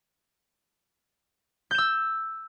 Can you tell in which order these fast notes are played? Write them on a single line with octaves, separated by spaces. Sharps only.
G6 E7 E6